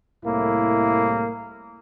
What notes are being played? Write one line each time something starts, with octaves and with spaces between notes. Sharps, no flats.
C2 A2 A#3 E4